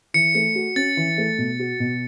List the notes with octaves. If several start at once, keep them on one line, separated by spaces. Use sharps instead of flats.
E3 C#7
A3 C#7
F#4
C#4 A6
E3
A3
B2
F#4
B2